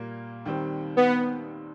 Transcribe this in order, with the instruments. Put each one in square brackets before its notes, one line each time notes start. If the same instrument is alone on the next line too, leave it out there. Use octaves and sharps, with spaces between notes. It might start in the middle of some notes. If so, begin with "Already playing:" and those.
Already playing: [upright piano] A#2 G3 A#3
D#2 D#3 G3 C4
[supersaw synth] B3